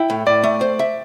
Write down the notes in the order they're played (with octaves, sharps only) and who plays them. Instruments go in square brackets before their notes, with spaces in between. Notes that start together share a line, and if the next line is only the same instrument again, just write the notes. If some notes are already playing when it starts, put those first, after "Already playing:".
Already playing: [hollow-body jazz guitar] E4 [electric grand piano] G5
[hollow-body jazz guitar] A2
[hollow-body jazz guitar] A2 [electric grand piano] D5
[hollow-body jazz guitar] A3
C5
E5